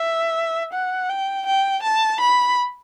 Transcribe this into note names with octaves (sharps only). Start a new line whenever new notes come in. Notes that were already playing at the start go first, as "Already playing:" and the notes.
Already playing: E5
F#5
G5
G5
A5
B5